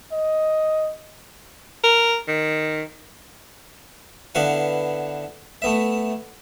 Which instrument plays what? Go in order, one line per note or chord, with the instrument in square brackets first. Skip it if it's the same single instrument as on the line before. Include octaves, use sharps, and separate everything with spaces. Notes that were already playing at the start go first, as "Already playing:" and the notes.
[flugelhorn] D#5
[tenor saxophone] A#4
D#3
[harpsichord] D3 B3 E4 B4 F5 F#5
A3 B3 E5